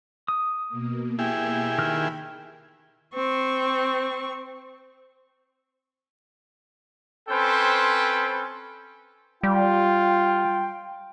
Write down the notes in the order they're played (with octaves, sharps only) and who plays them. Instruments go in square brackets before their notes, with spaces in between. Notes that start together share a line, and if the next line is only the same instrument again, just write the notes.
[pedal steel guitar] D#6
[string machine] B2 A#3
[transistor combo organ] E4 G4 G#4
[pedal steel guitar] D#3 F6 F#6 [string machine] B5
[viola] C4 C#6
[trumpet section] C4 C#4 A4 B4 C5 G5
[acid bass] G3 [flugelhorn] F4 [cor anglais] G5